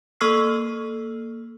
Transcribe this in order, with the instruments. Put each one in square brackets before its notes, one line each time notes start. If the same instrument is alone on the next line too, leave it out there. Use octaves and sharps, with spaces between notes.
[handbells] A#3 A4 C#6 E6 F6 C7